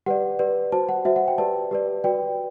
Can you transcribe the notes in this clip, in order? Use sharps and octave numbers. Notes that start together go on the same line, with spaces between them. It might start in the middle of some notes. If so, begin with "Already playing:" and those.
G4 B4 D5 F#5
G4 B4 D5
F#4 C5 A5
F#5
F#4 C5 E5
F#5
G5
G4 B4 D5 A5
G4 B4 D5
F#4 B4 D5 G5